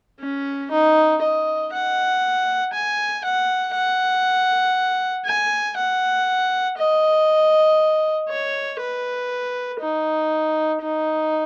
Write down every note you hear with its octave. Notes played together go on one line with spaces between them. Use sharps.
C#4
D#4
D#5
F#5
G#5
F#5
F#5
G#5
F#5
D#5
C#5
B4
D#4
D#4